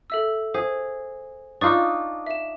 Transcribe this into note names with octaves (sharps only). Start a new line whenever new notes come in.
A4 E5 E6
G#4 C5
D4 D#4 F4 C#6 D#6 A6
E5 E7